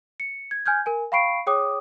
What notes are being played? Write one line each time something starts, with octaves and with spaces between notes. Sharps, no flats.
C#7
G#6
G#5 F6 G6 G#6
A#4 G#5
F5 G5 B5 C#6 C7 D7
G#4 C#5 G5 D6 D#6